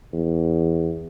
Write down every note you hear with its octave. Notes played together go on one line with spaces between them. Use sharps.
E2